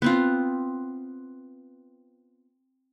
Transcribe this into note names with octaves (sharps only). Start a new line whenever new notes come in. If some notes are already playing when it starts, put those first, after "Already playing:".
B3 C4 F4